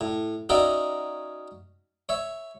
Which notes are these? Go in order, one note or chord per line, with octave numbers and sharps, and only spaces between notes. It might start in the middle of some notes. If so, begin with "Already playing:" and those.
A2
C#4 D#4 F#4 A#4 D5 E5
C#5 E5